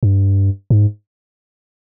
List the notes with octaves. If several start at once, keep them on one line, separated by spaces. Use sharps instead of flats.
G2
G#2